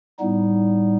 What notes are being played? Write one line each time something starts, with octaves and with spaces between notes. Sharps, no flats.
A2 G3 B3 D#4